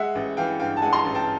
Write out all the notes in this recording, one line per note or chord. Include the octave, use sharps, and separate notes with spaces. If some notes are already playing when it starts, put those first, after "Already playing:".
Already playing: G#3 E5 F#5
A1
E3 F5 G5
G2 F5 G5
A5
G#3 F#5 G#5
A#5 C6
A1
G5 A5